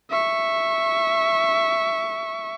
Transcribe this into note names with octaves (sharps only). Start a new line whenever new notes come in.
E5 C#6